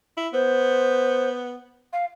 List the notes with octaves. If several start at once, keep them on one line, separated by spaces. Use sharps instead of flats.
E4
B3 C5
F5